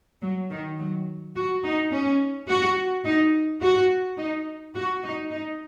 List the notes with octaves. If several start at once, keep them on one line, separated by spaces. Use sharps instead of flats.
F#3
D#3
F#3
F#4
D#4
C#4
F#4
D#4
F#4
D#4
F#4
D#4
D#4